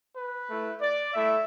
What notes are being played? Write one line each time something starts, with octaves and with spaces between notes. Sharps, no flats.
B4
A3 E4
D5
A3 E4 E5